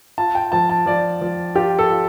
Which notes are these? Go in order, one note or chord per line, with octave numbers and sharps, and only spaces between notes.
F4 A5
G5
F3 A5
A5
F3 D5
F3
F4 G4
A4
F4